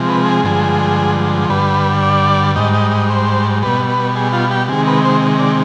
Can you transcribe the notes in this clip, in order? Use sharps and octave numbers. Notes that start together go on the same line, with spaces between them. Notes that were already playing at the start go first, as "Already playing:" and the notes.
Already playing: C3 F3 G#3
B4
G#4
G2 D3 F3 G#3
G2 D3 G3 B4
D5
G#2 G3 D#5
D#5
D#5
C5
B2 G3 B4
B4
G#4
F4
G4
C3 D#3 G#3 G#4
B4
C5
D5